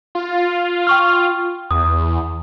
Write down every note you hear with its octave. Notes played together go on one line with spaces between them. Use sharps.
F4
G5 C#6 F6
E2 D#6